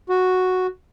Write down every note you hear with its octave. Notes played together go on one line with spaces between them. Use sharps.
F#4